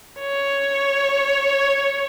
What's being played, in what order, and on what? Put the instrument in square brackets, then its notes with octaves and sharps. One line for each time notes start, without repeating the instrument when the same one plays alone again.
[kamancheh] C#5